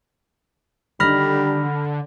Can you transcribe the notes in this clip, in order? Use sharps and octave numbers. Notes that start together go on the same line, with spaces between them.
D3 D#3 G3 D4 D#4 B5 F6 A#6